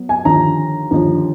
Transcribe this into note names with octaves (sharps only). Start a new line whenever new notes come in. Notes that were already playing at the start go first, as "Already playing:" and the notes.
Already playing: F#3 B3
G#5
D#2 D3 F3 A#5
D#2 D3 F3